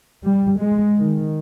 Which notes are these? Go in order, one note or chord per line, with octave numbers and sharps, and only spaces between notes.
G3
G#3
D#3